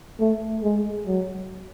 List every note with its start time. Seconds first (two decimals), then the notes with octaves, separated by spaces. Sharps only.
0.20 A3
0.63 G#3
1.07 F#3